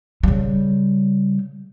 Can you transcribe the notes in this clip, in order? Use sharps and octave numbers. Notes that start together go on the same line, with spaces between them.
C#3 G3